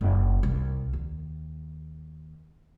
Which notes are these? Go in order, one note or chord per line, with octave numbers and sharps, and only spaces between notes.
F#1
C2
D#2